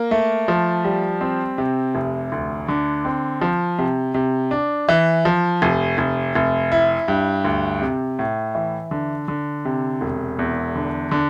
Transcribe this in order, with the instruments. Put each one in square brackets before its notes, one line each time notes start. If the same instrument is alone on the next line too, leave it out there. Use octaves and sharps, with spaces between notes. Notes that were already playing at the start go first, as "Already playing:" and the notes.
Already playing: [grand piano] A#3
A3
F3
G3
C4
C3
F1
D2
D3
C4
F3
C3
C3
D4
E3
F3
F1
F1
F1
E4
G2
D2
C3
A2
E3
D3
D3
C3
E1
E2
D3
D3